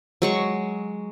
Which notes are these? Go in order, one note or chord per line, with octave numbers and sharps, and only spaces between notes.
F#3 G#3 C#6